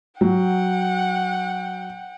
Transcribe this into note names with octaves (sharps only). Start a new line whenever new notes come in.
F#3 F#5 G5